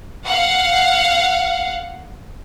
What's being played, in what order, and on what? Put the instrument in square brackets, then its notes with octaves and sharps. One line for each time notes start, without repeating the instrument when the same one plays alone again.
[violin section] F5 F#5